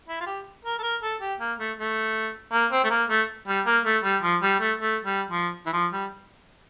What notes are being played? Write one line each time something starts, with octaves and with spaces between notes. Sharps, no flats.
E4
F4
G4
A#4
A4
A#4
A4
G4
A#3
A3
A3
A#3
C4
A3
A#3
A3
G3
A#3
A3
G3
F3
G3
A3
A3
G3
F3
E3
F3
G3